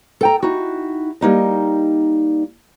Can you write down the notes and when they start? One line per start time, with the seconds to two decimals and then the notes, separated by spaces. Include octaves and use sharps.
0.21 A4 G5 A#5
0.43 D#4 E4 F#4
1.21 G3 A#3 D#4 D#5